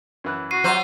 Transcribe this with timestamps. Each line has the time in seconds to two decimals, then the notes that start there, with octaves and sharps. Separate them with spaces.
0.24 F#2 E3 F#6
0.51 F#4 C7 D#7
0.64 F#3 F4 C5 E5 F#5 D6